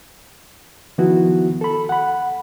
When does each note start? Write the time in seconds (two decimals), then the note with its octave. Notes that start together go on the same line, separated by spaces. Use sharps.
0.98 D#3 F3 B3 E4 F#4
1.61 A4 B5
1.89 F#5 B5